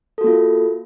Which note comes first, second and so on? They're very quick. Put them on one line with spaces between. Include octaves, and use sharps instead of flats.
A4 F#4 A#3 F4